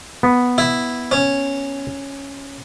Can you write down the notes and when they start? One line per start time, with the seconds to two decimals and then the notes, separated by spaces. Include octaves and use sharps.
0.23 B3
0.58 E4
1.11 C#4